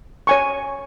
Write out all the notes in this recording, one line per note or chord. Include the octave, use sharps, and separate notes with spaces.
C#5 G#5 C#6